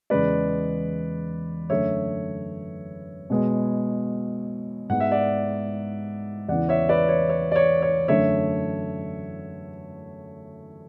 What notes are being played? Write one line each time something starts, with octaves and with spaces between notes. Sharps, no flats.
E2 C#3 G#3 B4 D5
F#2 D3 A3 C#5 E5
B2 G#3 B3
G#2 G#3 B3 F#5
E5
D5 F#5
E2 C#3 E3 B3 D5 F#5
C#5 E5
B4 D5
C#5
C#5
D5
C#5
C#5
F#2 D3 A3 C#5 E5